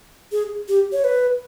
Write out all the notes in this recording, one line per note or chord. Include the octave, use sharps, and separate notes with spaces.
G#4
G4
C#5
B4